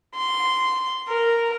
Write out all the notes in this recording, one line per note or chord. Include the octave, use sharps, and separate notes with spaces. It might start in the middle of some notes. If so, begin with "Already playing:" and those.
C6
A#4